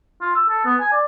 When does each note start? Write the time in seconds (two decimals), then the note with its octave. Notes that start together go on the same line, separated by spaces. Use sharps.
0.21 F4
0.35 E6
0.49 A4
0.65 B3
0.80 G#5
0.92 D5